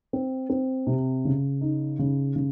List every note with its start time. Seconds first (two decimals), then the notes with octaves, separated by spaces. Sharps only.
0.13 C4
0.50 C4
0.87 C3
1.25 C#3
1.61 D#4
1.99 C#3
2.36 C#3